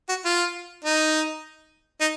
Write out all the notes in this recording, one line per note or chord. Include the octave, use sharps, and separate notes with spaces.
F#4
F4
D#4
D#4